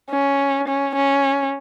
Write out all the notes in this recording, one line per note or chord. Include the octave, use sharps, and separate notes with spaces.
C#4
C#4
C#4